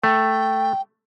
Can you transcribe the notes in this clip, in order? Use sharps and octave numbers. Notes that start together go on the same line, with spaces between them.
A3 G5